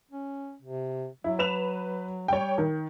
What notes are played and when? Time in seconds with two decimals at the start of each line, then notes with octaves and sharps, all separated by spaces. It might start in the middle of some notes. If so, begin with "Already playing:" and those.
0.11 C#4
0.62 C3
1.24 F#3 E4
1.39 B4 E7 F7
2.28 G3 C#5 G5
2.58 D#3